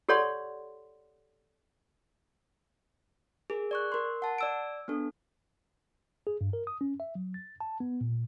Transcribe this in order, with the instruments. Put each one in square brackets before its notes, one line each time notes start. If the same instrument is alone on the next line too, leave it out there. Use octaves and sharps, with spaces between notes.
[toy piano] G4 A4 C#5 D5 F#5 C6
[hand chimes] G#4 A#4
D5 C#6 F#6
A#4 C6
F#5 A5
D5 E6 D7
B3 D4 A4
[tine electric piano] G#4
G2
A#4
D#6
C#4
E5
F#3
A6
A5
B3
A#2